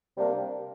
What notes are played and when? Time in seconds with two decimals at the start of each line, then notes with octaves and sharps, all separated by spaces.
0.17 C3 G3 A#3 D4